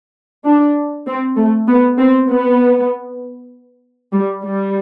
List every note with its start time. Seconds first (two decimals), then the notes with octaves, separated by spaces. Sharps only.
0.45 D4
1.07 C4
1.37 A3
1.68 B3
1.98 C4
2.30 B3
4.13 G3
4.44 G3